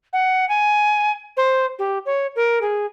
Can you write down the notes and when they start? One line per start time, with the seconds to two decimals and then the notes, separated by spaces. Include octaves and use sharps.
0.13 F#5
0.49 G#5
1.37 C5
1.79 G4
2.06 C#5
2.36 A#4
2.61 G#4